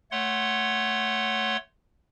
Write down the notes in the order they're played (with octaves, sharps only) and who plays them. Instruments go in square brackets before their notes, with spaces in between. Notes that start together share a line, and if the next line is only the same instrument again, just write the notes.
[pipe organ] A3 C#5 F#5 C6